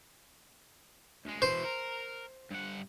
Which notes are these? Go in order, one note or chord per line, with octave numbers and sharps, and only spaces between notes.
D2 G#3
B2 E3 C5
A#4
G2 F#5